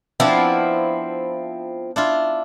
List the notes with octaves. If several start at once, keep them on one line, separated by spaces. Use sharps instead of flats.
F3 B3 C4 D4 E4
D4 E4 F4